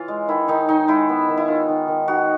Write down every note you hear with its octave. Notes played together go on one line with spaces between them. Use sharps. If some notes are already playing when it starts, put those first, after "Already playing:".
Already playing: E3 C#4 F4
G#3
D#3 E4
D#3 D#4
D#3 D#4
G#3 E4
B3
D#3
E4
D#3 F4
D#3
D#3
D#4 F#4